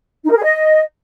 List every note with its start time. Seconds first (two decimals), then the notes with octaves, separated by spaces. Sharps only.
0.24 D#4
0.30 A#4
0.36 G#4
0.43 D#5